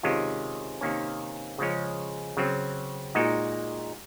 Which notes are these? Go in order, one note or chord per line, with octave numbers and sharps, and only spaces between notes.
C3 D#3 G#3 C#4 F4
C3 D#3 A#3 C#4
C#3 F3 G#3 C#4
C#3 F#3 C4
A#2 G#3 D#4 F#4